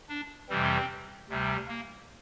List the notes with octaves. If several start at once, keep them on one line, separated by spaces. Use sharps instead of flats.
D4
F2 C3 E3 G3 C4
D2 C3 G3
A#3